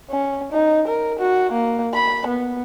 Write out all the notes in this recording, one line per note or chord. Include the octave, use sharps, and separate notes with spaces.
C#4
D#4
A#4
F#4
A#3
B5
B3